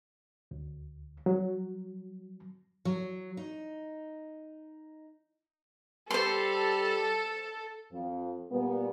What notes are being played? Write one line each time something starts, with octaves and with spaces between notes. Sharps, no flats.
D2
F#3
F#3
D#4
G3 A4 C5 C6
F2 F3
A#2 G3 B3